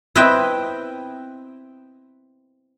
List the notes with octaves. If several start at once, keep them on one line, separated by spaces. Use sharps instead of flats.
C4 E4 B4 D#5 E5 G5